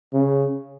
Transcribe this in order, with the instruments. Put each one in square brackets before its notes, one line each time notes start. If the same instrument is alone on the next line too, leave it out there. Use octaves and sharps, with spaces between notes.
[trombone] C#3